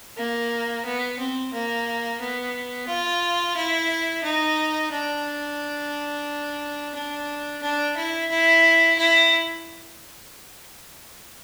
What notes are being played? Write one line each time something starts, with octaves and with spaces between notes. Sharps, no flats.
A#3
B3
C4
A#3
B3
F4
E4
D#4
D4
D4
D4
E4
E4
E4